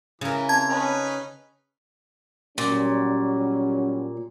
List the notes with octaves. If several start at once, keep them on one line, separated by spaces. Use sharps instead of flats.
C#3 E3 A#4
C4 A5 G#6
C#4 D#4 B4
A#2 F#3 G3 C#4